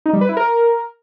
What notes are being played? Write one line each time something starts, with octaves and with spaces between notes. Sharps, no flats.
D#4
G3
B4
E4
A#4